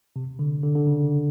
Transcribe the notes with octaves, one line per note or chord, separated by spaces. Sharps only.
C3
D3
D3
D3
C#3